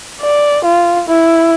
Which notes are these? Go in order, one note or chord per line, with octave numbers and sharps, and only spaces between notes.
D5
F4
E4